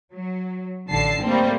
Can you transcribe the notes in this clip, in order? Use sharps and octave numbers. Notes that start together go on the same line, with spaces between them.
F#3
A1 D3 A5 C7
G3 A3 A#3 C4